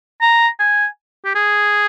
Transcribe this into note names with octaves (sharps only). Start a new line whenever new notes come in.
A#5
G#5
G4
G#4